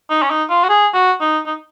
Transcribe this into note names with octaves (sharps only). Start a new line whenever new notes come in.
D#4
C#4
D#4
F4
F#4
G#4
F#4
D#4
D#4